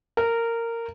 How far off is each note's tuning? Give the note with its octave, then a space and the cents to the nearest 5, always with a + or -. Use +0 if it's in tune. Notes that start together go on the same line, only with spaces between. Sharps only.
A#4 -15